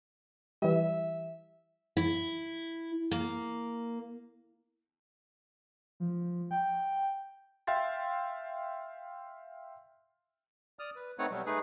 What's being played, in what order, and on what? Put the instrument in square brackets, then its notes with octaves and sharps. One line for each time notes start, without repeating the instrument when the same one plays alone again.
[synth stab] E3 G3 [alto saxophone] E5
[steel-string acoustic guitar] E4
A#3
[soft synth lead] F3
G5
[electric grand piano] E5 F5 G5 C6 A6
[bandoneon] D5 D#6 F6
B4
A3 C4 D#4 B4 C#5 F#5
B2 F#3 G3
A3 D#4 G#4 B4